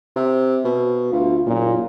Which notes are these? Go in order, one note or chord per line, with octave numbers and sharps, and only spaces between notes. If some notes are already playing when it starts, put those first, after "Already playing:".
C3
B2
D2 F4
F#1 A#2